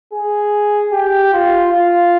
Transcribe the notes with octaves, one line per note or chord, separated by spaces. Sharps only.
G#4
G4
F4
F4